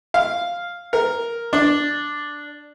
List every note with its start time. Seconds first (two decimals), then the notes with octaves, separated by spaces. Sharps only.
0.14 F5
0.93 A#4
1.53 D4